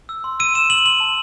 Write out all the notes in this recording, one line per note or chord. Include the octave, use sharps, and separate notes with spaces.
E6
C6
E6 D#7
C6 E7
E6 F#7
C6 F#7
A5